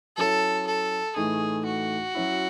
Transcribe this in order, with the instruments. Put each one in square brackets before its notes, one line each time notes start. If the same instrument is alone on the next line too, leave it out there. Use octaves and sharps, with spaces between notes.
[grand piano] F#3 C#4 E4 [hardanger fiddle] A4
[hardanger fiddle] A4
[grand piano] A2 E3 A3 D#4 [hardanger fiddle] G#4
[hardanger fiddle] F#4
[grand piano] F#3 C#4 E4